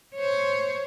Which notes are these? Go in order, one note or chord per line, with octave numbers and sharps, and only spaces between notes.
C5 C#5